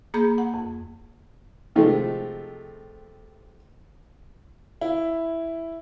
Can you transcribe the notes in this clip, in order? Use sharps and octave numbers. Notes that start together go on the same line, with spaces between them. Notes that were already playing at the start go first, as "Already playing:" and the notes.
A#3 G#4 A#5 B5 G6
F#5
F2
C3 D#3 F3 G#3 A3
E4